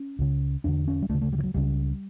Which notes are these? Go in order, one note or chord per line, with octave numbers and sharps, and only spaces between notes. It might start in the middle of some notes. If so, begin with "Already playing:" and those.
Already playing: C#4
C#2 C#3
E2 D3 D4
C#4
G3
D2 C#3 A3
A3
G3
E3
F#3
C#2 C#3 G3